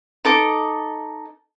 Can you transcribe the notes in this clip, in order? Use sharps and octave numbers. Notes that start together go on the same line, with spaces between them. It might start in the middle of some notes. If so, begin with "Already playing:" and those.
D#4 A4 D6